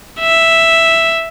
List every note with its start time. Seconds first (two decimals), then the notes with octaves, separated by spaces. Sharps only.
0.20 E5